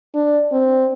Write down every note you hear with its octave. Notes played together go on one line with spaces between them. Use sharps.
D4
C4